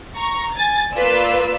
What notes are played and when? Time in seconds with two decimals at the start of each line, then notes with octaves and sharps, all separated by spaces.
0.15 A#5 C#6
0.52 G#5 A6
0.94 A#3 F4 B4 D5 E6